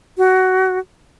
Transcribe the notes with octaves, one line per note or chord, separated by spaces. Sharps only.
F#4